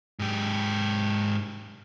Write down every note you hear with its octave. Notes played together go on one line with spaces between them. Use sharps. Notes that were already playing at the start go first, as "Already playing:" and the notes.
G#2 G4